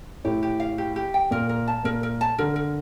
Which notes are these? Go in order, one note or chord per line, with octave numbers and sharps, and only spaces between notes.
A2 G4
G4
F5
G4
G4
G5
A#2 A#4
A#4
A5
A#2 A#4
A#4
A5
D3 A#4
A#4